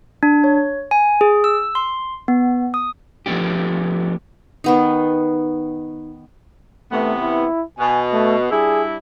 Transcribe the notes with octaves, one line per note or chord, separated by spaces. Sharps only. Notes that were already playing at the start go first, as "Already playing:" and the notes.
D4
C#5
G#5
G#4
E6
C6
B3
D#6
F3 A3 B3 D4 G4
D#3 B3 D#4
C3 E3 A3 B3
E4
B2 G#5
A3
G3 D4 E4 G#4